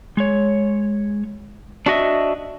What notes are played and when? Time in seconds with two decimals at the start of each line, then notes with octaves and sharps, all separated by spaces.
0.17 G#3 C#5
1.86 D4 F#4 D#5 E5